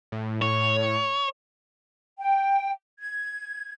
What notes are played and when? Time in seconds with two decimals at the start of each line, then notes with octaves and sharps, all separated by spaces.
0.12 A2
0.42 C#5
2.18 G5
2.99 G#6